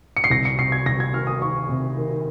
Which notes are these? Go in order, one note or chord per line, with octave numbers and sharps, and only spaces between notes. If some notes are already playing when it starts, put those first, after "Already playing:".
C#7
C7
C2 A#6
C#7
C3 C7
G#6
C2 A#6
G#6
D#3 F6
D#6
D#3 C#6
C3
D#3